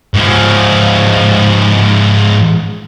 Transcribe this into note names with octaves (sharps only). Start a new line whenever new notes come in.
G#2 F3